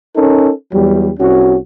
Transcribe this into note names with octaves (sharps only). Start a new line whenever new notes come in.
C#4 D#4 A4 A#4
E2 F#3 G3
C2 C#4 F#4